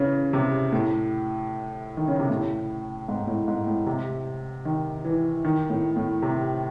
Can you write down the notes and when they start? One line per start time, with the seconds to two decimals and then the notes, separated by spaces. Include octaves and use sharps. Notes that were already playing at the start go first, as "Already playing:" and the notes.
Already playing: C#3 E3
0.33 C3
0.72 A2
1.97 D#3
2.08 C#3
2.19 C3
2.30 A2
3.08 G#2
3.27 A2
3.48 G#2
3.67 A2
3.86 C3
4.65 D#3
5.05 E3
5.44 D#3
5.70 A2
5.96 A2
6.22 C3